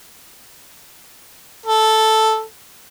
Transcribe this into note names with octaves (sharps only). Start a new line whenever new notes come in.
A4